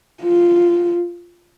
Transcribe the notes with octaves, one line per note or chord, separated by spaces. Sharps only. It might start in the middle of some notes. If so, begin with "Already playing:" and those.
F4